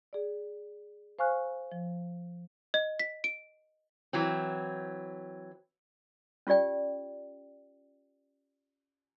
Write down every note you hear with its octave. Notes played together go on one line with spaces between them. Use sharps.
G#4 D5
C5 F5 G#5 C#6 F6 F#6
F3
D#5
B6
D7
E3 F#3 C4
C#4 F4 G4 D5 G5